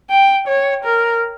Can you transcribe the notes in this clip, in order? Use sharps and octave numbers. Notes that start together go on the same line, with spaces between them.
G5
C#5
A#4